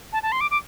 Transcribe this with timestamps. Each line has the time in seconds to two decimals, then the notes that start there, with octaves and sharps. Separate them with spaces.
0.13 A5
0.23 A5
0.32 C6
0.41 D6
0.51 D6